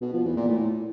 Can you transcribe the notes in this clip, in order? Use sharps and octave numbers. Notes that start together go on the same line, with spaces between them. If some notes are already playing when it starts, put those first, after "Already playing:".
B2
F3
E2
A#2
A2